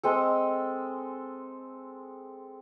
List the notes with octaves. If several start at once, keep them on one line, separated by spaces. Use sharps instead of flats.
G#3 C4 A4